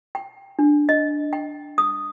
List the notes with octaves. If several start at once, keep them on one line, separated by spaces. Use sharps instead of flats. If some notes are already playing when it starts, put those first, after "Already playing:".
G5
D4
D#5
G5
D#6